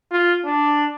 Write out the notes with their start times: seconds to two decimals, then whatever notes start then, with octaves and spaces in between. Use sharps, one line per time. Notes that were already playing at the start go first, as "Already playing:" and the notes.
0.11 F4
0.45 D4